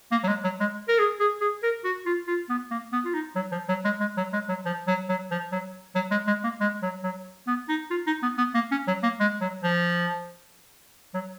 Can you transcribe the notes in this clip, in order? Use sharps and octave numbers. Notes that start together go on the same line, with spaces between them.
A#3
F#3
G#3
F#3
G#3
A#4
G#4
G#4
G#4
A#4
F#4
F4
F4
B3
A#3
B3
F4
D#4
F#3
F3
F#3
G#3
G#3
F#3
G#3
F#3
F3
F#3
F#3
F3
F#3
F#3
G#3
G#3
A#3
G#3
F#3
F#3
B3
D#4
F4
D#4
B3
B3
A#3
C#4
F#3
A#3
G#3
F#3
F3
F#3